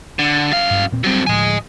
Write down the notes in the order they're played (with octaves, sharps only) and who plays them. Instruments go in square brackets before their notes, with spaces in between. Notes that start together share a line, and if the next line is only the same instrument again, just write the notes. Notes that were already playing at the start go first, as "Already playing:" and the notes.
[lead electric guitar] D3
F#2 F5
[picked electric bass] G2
E1 A#2 C4
[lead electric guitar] F#3 C4 [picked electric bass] G3
[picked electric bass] D2 A2 F3 [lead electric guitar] D#5 G#5